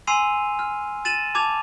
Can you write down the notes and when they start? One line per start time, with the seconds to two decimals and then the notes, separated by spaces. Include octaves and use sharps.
0.07 G#5 C6 E6 C7 D#7 F7
0.59 F6
1.05 A6 D#7 E7 F#7
1.35 A5 D6 G#6 F7